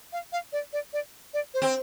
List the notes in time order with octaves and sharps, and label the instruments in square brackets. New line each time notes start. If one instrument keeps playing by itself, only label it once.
[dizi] F5
F5
D5
D5
D5
D5
C5
[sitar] C4